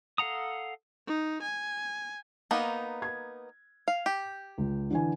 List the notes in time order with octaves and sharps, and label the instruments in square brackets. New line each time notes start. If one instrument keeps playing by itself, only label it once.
[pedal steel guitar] A4 F5 F#5 A#5 D#6
[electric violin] D#4
G#5
[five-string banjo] A#3 B3 D#4
[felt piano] G#6
[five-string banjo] F5
G4
[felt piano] C#2
D3 E3 G#5